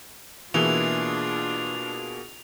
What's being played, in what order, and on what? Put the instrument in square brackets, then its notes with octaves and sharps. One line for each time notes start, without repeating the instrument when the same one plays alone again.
[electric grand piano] B2 A#3 G#4 [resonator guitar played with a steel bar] E3 [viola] D4 F4 [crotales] F7